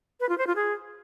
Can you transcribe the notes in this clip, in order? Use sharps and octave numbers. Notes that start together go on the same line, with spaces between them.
B4
F4
C5
F4
G#4